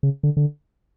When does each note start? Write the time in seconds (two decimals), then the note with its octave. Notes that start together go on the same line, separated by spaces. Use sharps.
0.03 C#3
0.23 D3
0.37 D3